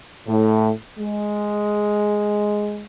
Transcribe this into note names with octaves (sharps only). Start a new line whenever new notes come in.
A2
G#3